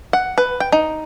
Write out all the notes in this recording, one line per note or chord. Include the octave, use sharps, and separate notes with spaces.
F#5
B4
G5
D#4